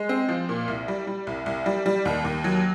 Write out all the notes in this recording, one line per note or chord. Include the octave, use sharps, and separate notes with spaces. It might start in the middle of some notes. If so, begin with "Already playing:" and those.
Already playing: G#3
C4
F3
A#2
C2
G3
G3
C2
C2
G3
G3
D#2
D#2
F#3